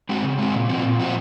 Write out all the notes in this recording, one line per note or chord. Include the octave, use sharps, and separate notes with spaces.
G#3 C4 F#4
C#3
G#3 C4 F#4
A#2
F3 C4 F#4
A#2
F3 C4 F#4